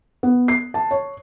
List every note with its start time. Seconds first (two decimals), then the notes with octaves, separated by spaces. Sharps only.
0.23 B3
0.48 C7
0.74 A5
0.91 C#5